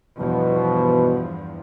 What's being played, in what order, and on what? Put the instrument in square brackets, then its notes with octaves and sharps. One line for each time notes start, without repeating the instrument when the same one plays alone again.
[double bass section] E2 G2 F3 [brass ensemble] B2